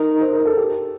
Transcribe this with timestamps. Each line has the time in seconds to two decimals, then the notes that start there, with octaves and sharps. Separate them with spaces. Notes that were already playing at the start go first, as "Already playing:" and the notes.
Already playing: D#4 A#4
0.21 C5
0.33 A#4
0.45 A4
0.57 G4